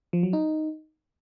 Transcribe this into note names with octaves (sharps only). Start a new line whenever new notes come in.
F3
F#3
D#4